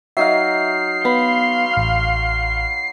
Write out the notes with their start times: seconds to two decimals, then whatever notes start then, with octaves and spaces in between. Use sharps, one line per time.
0.17 F#3 D#4 E5 F5 C7
1.05 B3 F5 B5 C6
1.73 A1 F6